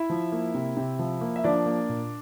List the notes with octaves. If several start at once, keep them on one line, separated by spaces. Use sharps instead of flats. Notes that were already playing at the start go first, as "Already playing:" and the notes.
Already playing: E4 E5
F3
A#3
C3
C3
F3
A#3
E5
F3 D4 D5
A#3
A#2